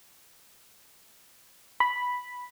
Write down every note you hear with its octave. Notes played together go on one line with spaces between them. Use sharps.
B5